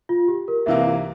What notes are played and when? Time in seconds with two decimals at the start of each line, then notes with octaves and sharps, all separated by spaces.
0.09 F4
0.28 G4
0.48 A#4
0.66 C2 C3 E3 A#3 F4 E5